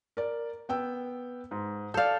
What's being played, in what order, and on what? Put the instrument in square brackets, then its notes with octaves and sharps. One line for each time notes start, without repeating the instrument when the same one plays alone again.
[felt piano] A#4 D5
B3 G5 E6
G#2
[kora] A4 F5 [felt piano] D5 G6